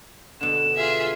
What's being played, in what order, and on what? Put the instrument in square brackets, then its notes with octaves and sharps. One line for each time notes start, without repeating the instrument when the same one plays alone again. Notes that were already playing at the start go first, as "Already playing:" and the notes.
[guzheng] B2 D3 [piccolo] E7
[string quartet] F4 G#4 E5